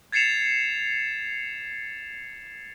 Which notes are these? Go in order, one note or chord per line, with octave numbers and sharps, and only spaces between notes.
G#6 A6 C7 C#7 E7 F7